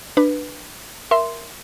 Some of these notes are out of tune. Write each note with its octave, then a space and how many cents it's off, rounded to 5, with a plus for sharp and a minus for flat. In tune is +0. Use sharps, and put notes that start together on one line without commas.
D4 +15 B4 +0
A#4 +0 E5 +10 C6 -5